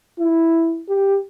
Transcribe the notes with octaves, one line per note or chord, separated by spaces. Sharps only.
E4
G4